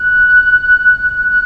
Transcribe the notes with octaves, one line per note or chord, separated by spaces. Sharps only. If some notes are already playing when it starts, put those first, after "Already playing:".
Already playing: F#6
F#6